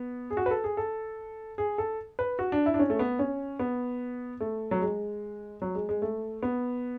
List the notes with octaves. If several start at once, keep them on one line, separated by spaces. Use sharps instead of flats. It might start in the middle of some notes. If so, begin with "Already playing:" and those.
Already playing: B3
G#4
F#4
B4
A4
G#4
A4
G#4
A4
B4
F#4
D4
E4
D4
C#4
A3
B3
C#4
B3
A3
F#3
G#3
F#3
G#3
G#3
A3
B3